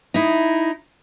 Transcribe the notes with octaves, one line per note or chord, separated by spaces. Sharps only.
D#4 E4